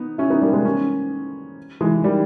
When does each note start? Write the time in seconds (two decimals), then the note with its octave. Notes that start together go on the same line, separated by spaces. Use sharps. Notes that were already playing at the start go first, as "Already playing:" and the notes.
Already playing: B3 D#4
0.18 C#4 E4
0.30 B3 D#4
0.42 G3 A#3
0.53 G#3 B3
0.65 A#3 C#4
1.81 E3 G#3
2.04 D#3 G3